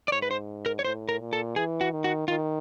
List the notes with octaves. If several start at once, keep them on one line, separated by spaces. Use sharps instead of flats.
D5
G#2 C#5
B4
C5
A#4
C#5
A2 C5
A#4
A#2
A4
E3 G#4
F#4
D#3
F#4
D#3 F4